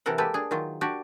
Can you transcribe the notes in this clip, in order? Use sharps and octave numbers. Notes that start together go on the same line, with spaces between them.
C3 E3 A4 A#4 F#5
G#3 A#3 G4 A4 B4
D4 G#4
D#3 F#3 F4
D4 F#4 G4 D5